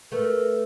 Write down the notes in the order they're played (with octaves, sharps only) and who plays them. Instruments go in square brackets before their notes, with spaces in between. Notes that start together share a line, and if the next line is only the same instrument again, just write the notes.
[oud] A3 B3 [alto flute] A#4